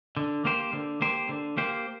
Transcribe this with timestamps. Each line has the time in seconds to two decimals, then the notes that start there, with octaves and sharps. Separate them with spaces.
0.17 D3
0.45 A#3 G4 C5
0.73 D3
1.02 A#3 G4 C5
1.29 D3
1.57 A#3 G4 C5